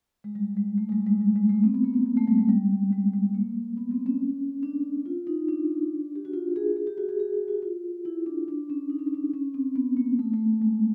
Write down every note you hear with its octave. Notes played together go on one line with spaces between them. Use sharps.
G#3
G3
G#3
A3
G#3
G3
G#3
G3
G#3
A3
C4
B3
A#3
B3
A#3
A3
G3
G#3
G3
G#3
G#3
A#3
B3
C4
C#4
D4
F4
D#4
D4
G4
F#4
F4
G#4
G#4
G4
F#4
G#4
G#4
G4
F#4
F4
E4
D4
D4
C#4
D#4
D4
C#4
D4
C#4
C4
B3
A#3
A3
A3
G#3